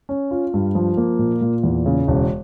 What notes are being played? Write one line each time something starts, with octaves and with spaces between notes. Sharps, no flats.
C#4
F4
G2
F3
A#3
A#2
A#2
E2
C#3
E1